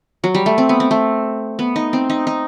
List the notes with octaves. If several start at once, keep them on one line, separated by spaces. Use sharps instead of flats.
F#3
G3
A3
C4
B3
C4
A3
B3
D#4
C4
D#4
D#4